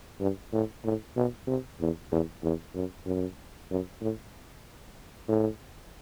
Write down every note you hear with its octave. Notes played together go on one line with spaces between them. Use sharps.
G2
A2
A2
B2
C3
E2
E2
E2
F#2
F#2
F#2
A2
A2